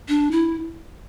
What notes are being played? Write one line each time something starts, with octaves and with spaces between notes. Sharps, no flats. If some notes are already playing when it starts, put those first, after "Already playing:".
D4
E4